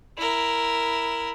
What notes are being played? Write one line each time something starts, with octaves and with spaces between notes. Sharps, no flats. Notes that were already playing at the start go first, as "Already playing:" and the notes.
E4 A#4